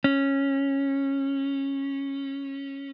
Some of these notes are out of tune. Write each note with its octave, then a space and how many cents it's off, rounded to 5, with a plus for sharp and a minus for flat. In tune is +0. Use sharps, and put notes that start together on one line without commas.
C#4 -10